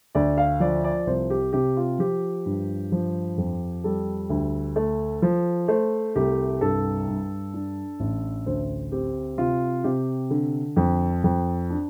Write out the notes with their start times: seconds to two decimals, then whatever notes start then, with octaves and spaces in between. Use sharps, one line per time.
0.15 D2 D5
0.38 F5
0.60 F3 D5
0.84 D5
1.07 C2 C5
1.30 G4
1.53 C3 G4
1.77 F4
1.99 F3 G4
2.46 G2
2.92 F3
3.38 F2
3.84 G3 A4
4.30 D2
4.76 A3
5.22 F3
5.68 A3 C5
6.16 C2 G4
6.61 G2 A4
7.08 G2
7.54 D4
8.00 A1
8.46 D2 C5
8.92 C4 G4
9.38 C3 F4
9.84 C3 G4
10.30 D3
10.76 F2
11.24 F2
11.70 D4